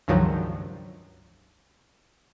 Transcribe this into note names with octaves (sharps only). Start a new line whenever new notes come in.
C#2 G2 D#3 F3 F#3